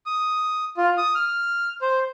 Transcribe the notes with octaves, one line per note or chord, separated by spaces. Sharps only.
D#6
F4
D#6
F6
C5